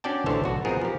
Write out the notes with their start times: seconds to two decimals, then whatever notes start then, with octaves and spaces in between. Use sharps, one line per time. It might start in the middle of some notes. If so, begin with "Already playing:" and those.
0.04 C#4 D4 F#4 D5 G5 A5
0.26 A1 D3 E3 C5 C#5 A5
0.44 B1 F#4
0.65 F3 B3 C4 D#4 G#4 A#4
0.81 F3 G4